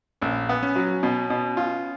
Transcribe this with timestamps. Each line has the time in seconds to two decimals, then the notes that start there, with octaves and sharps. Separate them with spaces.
0.21 A#1 C#4
0.49 B3
0.63 C#4
0.76 F#3
1.03 B2 B3
1.30 B2
1.57 F4